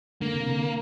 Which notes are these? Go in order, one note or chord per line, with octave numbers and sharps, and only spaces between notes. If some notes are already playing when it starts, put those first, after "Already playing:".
D3 A#3
C3
D3